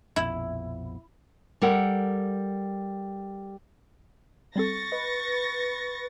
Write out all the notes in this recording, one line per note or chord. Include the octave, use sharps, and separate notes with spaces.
A#1 F2 B2 E4
G3 A4 A#4 F#5
G3 C4 A4 C#6 A6 A#6
B4 D#5